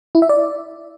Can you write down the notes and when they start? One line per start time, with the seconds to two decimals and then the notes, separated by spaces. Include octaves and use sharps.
0.15 E4
0.22 E5
0.29 D5